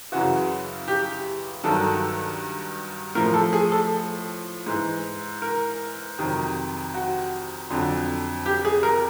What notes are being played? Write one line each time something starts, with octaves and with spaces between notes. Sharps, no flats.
F#2 C#3 E3 F#4
G4
G2 D#3 F#3 A4
A2 F3 A#4
A4
G#4
A4
G#2 E3
A#4
F2 C3 D#3 F#3
F#4
F2 D3 F#3
G4
G#4
A#4